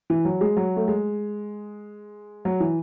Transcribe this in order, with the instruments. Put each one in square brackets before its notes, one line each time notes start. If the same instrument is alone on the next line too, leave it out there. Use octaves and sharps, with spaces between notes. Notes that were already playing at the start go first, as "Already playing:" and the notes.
[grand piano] E3
F#3
G#3
F#3
A3
G#3
F#3
E3